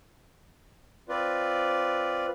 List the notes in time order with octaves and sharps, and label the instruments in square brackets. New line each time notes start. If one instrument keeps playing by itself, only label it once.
[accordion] C4 F4 B4 D5